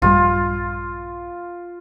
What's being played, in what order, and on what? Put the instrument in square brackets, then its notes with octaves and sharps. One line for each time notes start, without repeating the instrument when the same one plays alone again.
[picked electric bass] A#1 G2 G3 [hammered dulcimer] F4